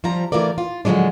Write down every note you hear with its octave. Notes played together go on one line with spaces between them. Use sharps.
F3 G3 C4 F4 A#5
E3 A3 F4 A#4 D5
F4
D3 F3 F#3 G#3 D4